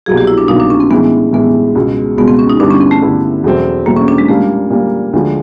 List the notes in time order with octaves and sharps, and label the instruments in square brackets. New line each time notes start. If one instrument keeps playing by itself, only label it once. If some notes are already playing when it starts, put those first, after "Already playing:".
[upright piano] C2 B2 F#3 A#3 [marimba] G#4
[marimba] G4
E4
D4
[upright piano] C2 B2 F#3 A#3 [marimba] D#4
[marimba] D4
C#4
C4
[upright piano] A2 E3 G#3 [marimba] B3
[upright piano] A2 E3 G#3 [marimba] B3
[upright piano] C#2 B2 G#3
[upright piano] C#2 B2 G#3 [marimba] B3
[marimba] C4
C#4
D#4
[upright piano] G2 D3 G3 B3 E4 [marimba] D4
[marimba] C#4
C4
A3
[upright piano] G2 D3 G3 B3 E4
E2 B2 F#3 A3 C4
[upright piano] E2 B2 F#3 A3 C4 [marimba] A#3
[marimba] C#4
D4
G#3
[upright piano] A#2 G3 A#3 [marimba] A3
[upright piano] A#2 G3 A#3
D2 D3 F3 G#3